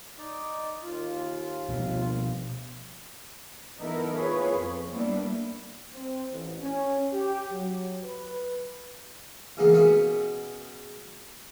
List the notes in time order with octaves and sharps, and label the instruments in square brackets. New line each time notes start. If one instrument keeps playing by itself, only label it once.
[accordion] D#4 D5
D#2 F4
[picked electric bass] B2 F3
[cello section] E3 B3 D#4 E4 A4 A#4
F4 G#4 B4 C#5
F2
G3 A#3 B3 D4 E4
[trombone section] C4
A1
C#4
G4
F#3
B4
[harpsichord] E2 C#3 E3 G#3 A#3 B3
B2 C#4 F#4 G#4 B4